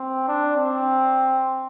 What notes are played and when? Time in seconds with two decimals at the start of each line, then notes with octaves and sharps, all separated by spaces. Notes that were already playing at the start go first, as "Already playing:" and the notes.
Already playing: C4
0.28 D4
0.56 C4